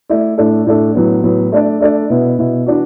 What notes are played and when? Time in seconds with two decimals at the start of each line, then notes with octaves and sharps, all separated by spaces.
0.10 A3 E4 D5
0.38 A2 A3 D4 A4
0.67 A2 A3 D4 A4
0.95 A2 F#3 B3
1.24 A2 F#3 B3
1.52 A3 D4 A4 D5
1.81 A3 D4 A4 D5
2.10 B2 B3 E4
2.39 B2 B3 E4
2.66 E3 D4 F#4